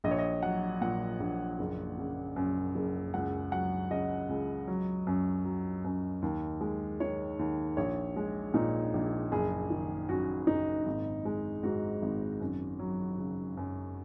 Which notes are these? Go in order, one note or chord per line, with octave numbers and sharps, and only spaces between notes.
A#1 D#5
C#5
D#5
F#3 F#5
A#2 F#5
A#1
F#1
C#3
F#2
F#1
C#2 F#5
F#3 F#5
C#3 D#5
C#2
F#3
F#2
F#3
F#2
D#2
G#3
D#3 C#5
D#2
A#1 C#5
G#3
A#2 D#4
A#1
F#1 G#4
D#3
F#2 F#4
F#1 D#4
G#1
G#3
G#2 F#4
G#1
F#2
F#3
C#3
F#2